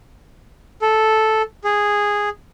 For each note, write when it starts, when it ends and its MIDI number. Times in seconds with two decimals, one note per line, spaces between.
0.82 1.42 69
1.64 2.29 68